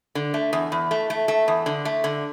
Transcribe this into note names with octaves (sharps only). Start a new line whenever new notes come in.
D3
A3
E2
E2
A3
A3
A3
E2
D3
A3
D3